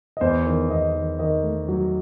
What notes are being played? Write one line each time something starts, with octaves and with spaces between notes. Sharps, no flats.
D#5
E2 C5
D#3
E2 D#5
D#3
D#3 D#5
A3
F#3